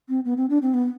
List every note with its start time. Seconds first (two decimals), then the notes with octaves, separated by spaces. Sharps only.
0.09 C4
0.25 B3
0.37 C4
0.50 D4
0.62 C4
0.74 B3